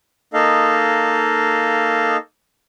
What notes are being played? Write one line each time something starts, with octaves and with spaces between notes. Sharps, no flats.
A#3 D#4 A4 D#5 F5